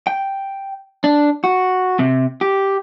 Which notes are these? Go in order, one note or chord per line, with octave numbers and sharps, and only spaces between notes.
G5
D4
F#4
C3
G4